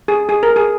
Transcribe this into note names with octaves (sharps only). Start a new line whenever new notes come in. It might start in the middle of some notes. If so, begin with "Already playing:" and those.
G#4
G#4
A#4
G#4